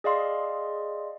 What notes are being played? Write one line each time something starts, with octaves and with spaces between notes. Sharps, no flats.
G#4 D5 D#5 F5 C6